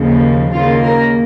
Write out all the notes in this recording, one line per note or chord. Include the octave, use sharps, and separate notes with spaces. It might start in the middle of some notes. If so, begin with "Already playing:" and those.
Already playing: D#2 C#3 F3
D#2 C#3 A#3 F4
A#4